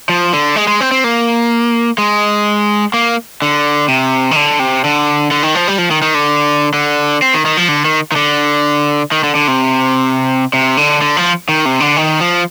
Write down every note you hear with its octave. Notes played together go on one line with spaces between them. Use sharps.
F3
D3
G#3
G#3
C4
C4
A#3
G#3
A#3
D3
C3
D#3
D3
C3
D3
D3
D#3
F3
G3
F3
D#3
D#3
D3
D3
C4
D#3
D#3
F3
D3
D#3
D#3
D3
D#3
D3
D3
C3
C3
D3
D3
F3
D#3
C3
D3
D#3
F3